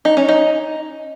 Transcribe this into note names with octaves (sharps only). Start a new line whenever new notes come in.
D#4
C#4
D#4